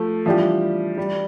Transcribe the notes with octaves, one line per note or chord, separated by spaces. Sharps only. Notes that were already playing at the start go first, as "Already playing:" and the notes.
Already playing: F3 A3
E3 F3 G3 D4 G4
G3